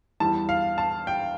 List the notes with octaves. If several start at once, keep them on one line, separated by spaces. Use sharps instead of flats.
E2 E3 G3 A5
F5
A5
G5